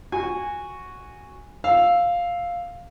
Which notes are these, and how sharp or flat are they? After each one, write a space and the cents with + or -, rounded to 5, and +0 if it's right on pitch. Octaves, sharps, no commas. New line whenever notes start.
F#4 +0 G#5 -10
F5 +5 E6 +0